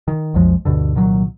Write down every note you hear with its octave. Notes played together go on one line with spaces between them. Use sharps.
D#3
B1 F2 F3 G#3
D2 G2 B2 D3
C2 A#2 D#3 F#3